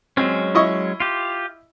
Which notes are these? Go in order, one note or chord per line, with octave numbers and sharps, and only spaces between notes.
F#3 G#3 C4 C#4
E4 D#5 C#6
F4 G4